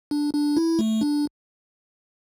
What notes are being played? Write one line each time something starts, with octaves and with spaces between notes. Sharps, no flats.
D4
D4
E4
A3
D4